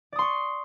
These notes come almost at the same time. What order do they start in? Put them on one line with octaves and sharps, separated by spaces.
D5 D#6 C6 C#6